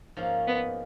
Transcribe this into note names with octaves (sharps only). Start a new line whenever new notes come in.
G#2 F3 A#3 C#4
B3